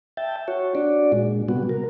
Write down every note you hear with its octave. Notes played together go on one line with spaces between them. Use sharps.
E5 G5 A5
F#4 C#5
D4 F#4 D5
A#2 G#3
C3 G3 B3 F#4
A#4